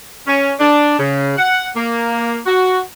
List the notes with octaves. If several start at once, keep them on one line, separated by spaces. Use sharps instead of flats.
C#4
D4
C#3
F#5
A#3
F#4